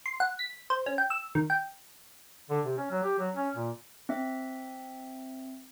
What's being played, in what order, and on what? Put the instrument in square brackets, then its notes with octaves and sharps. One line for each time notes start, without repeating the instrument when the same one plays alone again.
[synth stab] C6
F#5
B6
C5
C#4
G5
E6
D#3
G5
[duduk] D3
C3
C#4
F#3
G4
F#3
C#4
A#2
[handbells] C4 E5